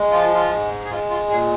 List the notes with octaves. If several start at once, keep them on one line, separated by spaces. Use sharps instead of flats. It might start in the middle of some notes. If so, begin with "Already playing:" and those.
Already playing: G#3
F3 F4
F4
G#2
G#4
G#3 F4
F4
A#2 G#4